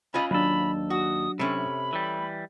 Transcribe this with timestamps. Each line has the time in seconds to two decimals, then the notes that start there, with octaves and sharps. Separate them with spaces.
0.14 C#4 F4 D#5 B5
0.31 D#2 F#3 D4 A4 B5
0.90 F#4 D#6
1.39 C3 A3 C#4 B5
1.93 E3 G3